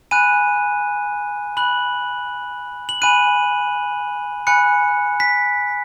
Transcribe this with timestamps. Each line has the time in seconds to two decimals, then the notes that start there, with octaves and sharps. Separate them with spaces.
0.11 G#5 B5 F#6 D#7
1.57 B5 F#6 F#7
2.89 F#7
3.02 G#5 B5 F#6 D#7
4.47 G#5 B5 F#6 C#7
5.20 B6